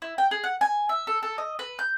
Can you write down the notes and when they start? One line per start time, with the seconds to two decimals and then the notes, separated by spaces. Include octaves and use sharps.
0.02 E4
0.18 G5
0.31 G#4
0.44 F#5
0.61 G#5
0.89 E5
1.07 A4
1.23 A4
1.38 D#5
1.59 B4
1.79 G6